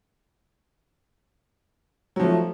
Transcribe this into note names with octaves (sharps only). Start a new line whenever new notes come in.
F3 F#3 A3